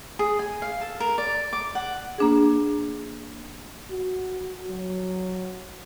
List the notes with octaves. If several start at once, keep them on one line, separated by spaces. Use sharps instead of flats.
G#4
G#5
F5
A4
A#4
D5
D6
F#5
A#3 D4 G#4
F#4
F#3